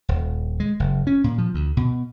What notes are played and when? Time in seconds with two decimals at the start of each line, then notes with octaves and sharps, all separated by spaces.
0.09 D#1
0.60 G#3
0.80 F#1
1.07 C#4
1.24 A#2
1.38 F3
1.54 D2
1.77 B2